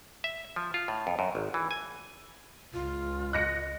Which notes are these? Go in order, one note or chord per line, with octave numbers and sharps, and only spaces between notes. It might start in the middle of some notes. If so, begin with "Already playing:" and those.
E5
F3
F4
A2
F2
F#2
G#1
E3
G#5
C#2 F4
D#5 F#6 A#6 C#7